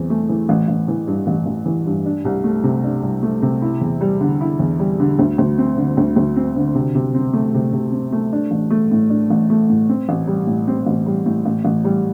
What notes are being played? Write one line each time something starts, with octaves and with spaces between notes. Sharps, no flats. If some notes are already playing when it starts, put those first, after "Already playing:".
Already playing: E2 E3 C4
A3
E3
A1
A1
E3
G2
A1
A1
E3
G2
D4
C2
A3
C3
D4
C2
A3
C3
E4
E2
G3
D3
E4
E2
G3
D3
D2
D2
C4
D3
D2
D2
C4
D3
C3
C3
C4
A3
C3
C3
C4
A3
D4
A1
A3
A2
D4
A1
A3
A2
C4
A1
G3
A2
C4
A1
G3
A2
A1
A1
G3